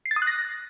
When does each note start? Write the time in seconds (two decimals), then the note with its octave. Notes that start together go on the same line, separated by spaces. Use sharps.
0.06 C7
0.11 A6
0.16 D#6
0.22 F#6
0.27 A#6